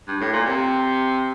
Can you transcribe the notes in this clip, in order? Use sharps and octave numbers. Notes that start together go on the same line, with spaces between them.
G2
A2
A#2
C3